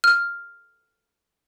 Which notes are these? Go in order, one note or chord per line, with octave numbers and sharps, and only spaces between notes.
F6